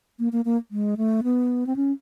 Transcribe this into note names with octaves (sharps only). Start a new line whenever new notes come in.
A#3
A#3
A#3
G#3
A3
B3
C4
C#4